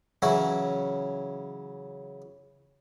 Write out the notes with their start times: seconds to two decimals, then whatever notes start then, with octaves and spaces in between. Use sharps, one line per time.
0.22 C#3 E3 F#3 C#4 E4 F#4